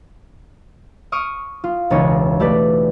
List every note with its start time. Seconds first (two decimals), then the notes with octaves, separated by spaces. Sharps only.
1.12 C#6 D#6 F6 D7
1.64 F4
1.90 E1 C#2 D#4 C#5
2.40 A3 G4 B4 D5